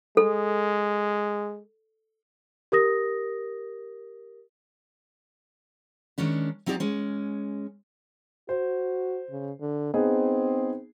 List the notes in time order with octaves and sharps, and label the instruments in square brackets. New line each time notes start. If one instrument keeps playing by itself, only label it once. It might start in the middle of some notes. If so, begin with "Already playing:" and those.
[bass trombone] G#3 [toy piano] A4
[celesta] G4 A#4 D#6 A#6
[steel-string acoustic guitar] D#3 G#3 C#4 D4
F#3 C4 D#4 G4 D5
G#3 C#4
[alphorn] F#4 [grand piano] C5
[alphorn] C#3
D3
[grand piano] B3 D#4 G#4 [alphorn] C4